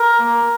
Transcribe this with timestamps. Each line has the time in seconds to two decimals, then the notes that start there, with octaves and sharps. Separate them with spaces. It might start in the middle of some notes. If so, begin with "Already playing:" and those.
Already playing: A#4
0.19 A#3